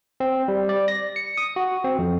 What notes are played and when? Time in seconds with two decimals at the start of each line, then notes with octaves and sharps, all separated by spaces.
0.20 C4
0.48 G3
0.69 D5
0.88 A#6
1.16 C#7
1.38 D#6
1.56 F#4
1.84 C4
1.99 F2